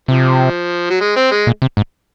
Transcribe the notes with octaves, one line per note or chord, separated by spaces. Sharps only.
C3 F3
F#3
G#3
C4
G#3
A#2
C3
G#2